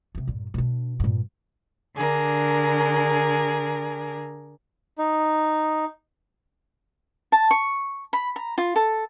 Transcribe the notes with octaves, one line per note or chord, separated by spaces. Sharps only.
C3 B3
G1 A#2
B2 D4
G2 A#2
D3 D4 G#4 A#4
D#4
A5
C#6
B5
A#5
F4
A4